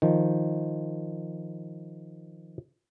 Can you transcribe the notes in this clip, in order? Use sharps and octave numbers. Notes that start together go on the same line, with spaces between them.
D#3 F3